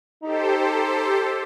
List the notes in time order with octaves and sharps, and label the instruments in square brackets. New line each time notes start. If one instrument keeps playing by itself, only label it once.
[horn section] D#4 [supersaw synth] G4 A4 C5